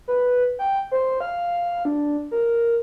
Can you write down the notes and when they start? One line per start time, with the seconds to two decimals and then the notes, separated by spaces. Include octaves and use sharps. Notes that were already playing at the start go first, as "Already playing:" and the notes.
0.08 B4
0.59 G5
0.92 C5
1.21 F5
1.85 D4
2.31 A#4